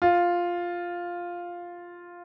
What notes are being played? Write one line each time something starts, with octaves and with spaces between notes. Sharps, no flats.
F4